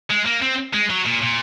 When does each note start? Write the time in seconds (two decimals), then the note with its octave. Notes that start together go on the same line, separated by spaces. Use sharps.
0.10 G#3
0.25 A#3
0.42 C4
0.74 G#3
0.90 F#3
1.06 A#2
1.23 A#2